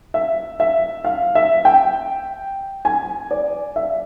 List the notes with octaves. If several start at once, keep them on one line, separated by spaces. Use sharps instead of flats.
E5
E5
F5
E5
G5
G#5
D5
E5